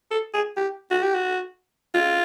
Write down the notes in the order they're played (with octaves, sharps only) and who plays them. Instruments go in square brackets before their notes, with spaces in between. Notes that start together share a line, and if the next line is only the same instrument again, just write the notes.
[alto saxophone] A4
G#4
G4
F#4
G4
F#4
F4